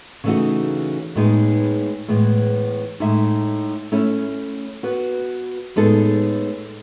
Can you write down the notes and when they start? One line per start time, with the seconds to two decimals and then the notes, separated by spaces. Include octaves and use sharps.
0.24 C#3 E3 A3 D#4 F#4
1.15 A2 G#3 B3 D#4 G#4
2.08 A2 E3 G#3 B3
3.00 A2 G#3 D#4 A4 E5
3.92 A3 C#4 E4
4.83 B3 F#4 B4
5.76 A2 G#3 B3 D#4 A4